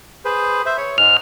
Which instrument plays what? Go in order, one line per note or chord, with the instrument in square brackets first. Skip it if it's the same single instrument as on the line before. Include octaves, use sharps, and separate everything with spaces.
[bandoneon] G#4 B4 C5
C5 E5
C#5
[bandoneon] G#2 G#3 [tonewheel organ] F6